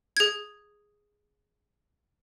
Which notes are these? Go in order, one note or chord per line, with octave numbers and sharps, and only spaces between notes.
G#4 G#6